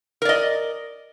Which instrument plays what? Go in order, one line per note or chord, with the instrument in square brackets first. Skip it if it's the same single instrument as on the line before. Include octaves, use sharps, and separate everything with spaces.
[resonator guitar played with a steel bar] A#4
D5
D#5